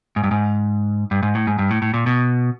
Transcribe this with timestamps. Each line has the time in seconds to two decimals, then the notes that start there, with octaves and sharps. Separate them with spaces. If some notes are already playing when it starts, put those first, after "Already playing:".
0.16 G#2
0.24 G2
0.31 G#2
1.11 G2
1.23 G#2
1.35 A2
1.47 G#2
1.59 G2
1.71 A2
1.82 A2
1.94 A#2
2.06 B2